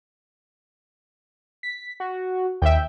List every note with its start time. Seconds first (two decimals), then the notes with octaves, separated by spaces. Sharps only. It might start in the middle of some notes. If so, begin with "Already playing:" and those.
1.63 B6
2.00 F#4
2.62 D#2 E5 G5